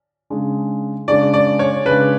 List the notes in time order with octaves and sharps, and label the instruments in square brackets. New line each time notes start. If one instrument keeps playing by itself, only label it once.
[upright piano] C#3 G#3 D4
[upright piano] C#3 G#3 D4 [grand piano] D5
[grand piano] D5
C#5
[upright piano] C#3 G#3 D4 [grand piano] B4